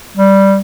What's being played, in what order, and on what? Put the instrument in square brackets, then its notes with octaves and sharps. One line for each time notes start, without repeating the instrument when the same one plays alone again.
[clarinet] G3